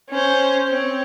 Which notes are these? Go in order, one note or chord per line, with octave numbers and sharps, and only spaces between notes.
C#4 C5
C4 C#5